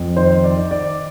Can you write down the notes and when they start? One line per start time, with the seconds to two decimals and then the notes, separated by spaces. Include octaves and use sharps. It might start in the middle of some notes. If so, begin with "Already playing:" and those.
Already playing: F2
0.16 D#3 C5
0.44 D5
0.57 D#3
0.71 D5